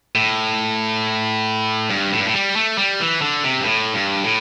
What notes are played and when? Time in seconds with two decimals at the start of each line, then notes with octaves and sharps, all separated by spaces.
0.15 A2
1.90 G2
2.12 A2
2.19 G2
2.26 A2
2.34 G3
2.56 A3
2.78 G3
3.00 E3
3.22 D3
3.44 C3
3.59 G2
3.65 A2
3.94 G2
4.24 A2